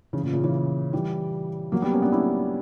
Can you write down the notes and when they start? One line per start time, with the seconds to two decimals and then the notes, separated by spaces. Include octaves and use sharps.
0.13 C#3 E3
0.23 A#2 C#3
0.33 A#2 C#3
0.44 C#3 E3
0.93 E3 G3
1.72 F#3 A#3
1.82 G3 B3
1.93 A#3 C#4
2.02 B3 D4
2.12 C#4 E4